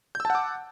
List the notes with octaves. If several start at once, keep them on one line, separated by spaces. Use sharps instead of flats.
F#5 A5 D6 E6 G6